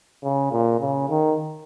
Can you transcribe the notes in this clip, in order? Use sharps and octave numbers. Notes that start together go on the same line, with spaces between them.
C#3
A#2
C#3
D#3